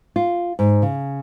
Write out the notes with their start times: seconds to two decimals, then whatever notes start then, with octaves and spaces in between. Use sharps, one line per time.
0.16 F4
0.59 G#2
0.82 C#3